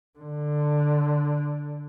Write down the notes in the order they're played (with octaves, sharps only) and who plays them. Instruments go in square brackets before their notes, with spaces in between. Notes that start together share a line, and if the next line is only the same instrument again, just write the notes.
[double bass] D3